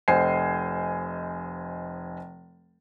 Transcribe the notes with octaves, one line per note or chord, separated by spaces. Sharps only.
F1 C5 D#5 G#5 C7